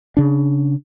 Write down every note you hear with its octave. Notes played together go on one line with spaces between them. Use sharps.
C#3 D4